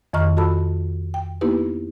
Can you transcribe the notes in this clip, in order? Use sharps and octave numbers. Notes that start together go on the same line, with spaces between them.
F2 D#3 D#5 A#5 C#6 F6
F4 F#4 A4 A5 B5 E6
G5
A#3 B3 D#4 E4 G4 B4